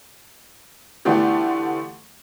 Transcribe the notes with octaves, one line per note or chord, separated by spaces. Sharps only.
D3 E3 A3 B3 F4 G4